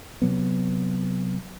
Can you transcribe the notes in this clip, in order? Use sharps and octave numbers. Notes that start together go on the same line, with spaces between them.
C3 F#3 B3